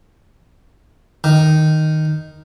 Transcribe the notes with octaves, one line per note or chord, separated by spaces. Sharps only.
D#3